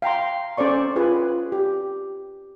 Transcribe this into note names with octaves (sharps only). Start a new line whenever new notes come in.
F5 G5 A#5 C6
C#4 A4 C5 D5 C#6
F4 G#4 B4
G4